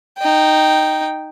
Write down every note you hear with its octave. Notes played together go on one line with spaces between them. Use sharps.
D#4 G5